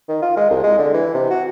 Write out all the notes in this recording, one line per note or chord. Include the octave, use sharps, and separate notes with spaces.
D#3
F4
G#3
C2
G#3
D3
E3
C3
F#4